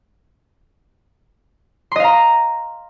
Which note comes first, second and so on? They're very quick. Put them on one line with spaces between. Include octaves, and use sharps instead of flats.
C6 D#5 F5 A#5